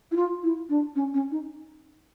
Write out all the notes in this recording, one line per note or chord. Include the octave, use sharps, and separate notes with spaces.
E4
F4
E4
D4
C#4
C#4
D#4